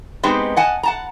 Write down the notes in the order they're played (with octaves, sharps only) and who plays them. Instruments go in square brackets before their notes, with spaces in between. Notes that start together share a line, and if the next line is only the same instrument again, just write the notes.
[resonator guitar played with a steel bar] G#3 B3 C4 D#4 G4
D#5 F#5 G#5 A5
F#5 A5 A#5